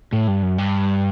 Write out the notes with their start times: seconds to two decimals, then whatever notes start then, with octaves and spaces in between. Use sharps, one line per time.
0.13 A2
0.28 G2
0.43 F#2
0.58 G2